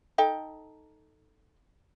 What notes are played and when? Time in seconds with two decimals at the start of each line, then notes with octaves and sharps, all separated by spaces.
0.18 D#4 A4 G5